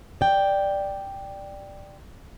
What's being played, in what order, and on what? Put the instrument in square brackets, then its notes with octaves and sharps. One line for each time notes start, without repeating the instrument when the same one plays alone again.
[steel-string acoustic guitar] D5 G5